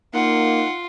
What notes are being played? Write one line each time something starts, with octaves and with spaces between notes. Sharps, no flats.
A#3 D#4 F4 F#5